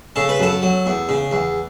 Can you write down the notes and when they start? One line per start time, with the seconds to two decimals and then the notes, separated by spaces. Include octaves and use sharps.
0.16 C#3 A4
0.29 B4
0.39 F#2 A4
0.62 F#3
0.86 E2
1.09 C#3
1.32 E2